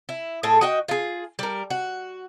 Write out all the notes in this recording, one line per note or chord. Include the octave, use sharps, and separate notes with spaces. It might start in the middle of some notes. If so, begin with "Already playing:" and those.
E4
A2 G#4 A4
F#4 D#5 G5
F4 G#4
G3 A#4
F#4